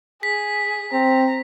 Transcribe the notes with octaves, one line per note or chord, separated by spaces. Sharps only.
G#4 B6
C4 A#5